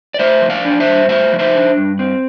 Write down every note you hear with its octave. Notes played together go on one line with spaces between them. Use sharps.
D5
A3 C5 E5
F3
D5 F5
D4
C5 E5
G2
A3 C5 E5
F3
C5 E5
D4
G2
C4